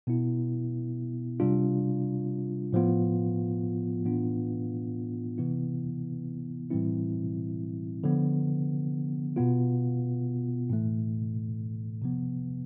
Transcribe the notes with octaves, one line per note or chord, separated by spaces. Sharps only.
B2 B3 E4
C3 G3 D4 F4
A2 F3 B3 F4
A2 E3 B3 D4 F4
C3 E3 B3 E4
A2 E3 G3 C4 E4
D3 F3 B3
B2 B3 F4
A2 E3 A3
C3 F3 B3